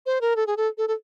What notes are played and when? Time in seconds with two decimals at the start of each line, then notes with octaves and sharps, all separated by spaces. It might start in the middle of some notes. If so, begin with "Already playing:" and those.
0.06 C5
0.21 A#4
0.36 A4
0.47 G#4
0.57 A4
0.78 A4
0.88 A4